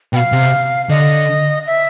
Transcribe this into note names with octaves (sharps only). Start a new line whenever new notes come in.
B2 G5
F5
C3
D3 D#5
E5